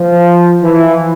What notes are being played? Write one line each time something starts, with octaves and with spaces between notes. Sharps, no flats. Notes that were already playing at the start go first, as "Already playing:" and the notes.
Already playing: F3
E3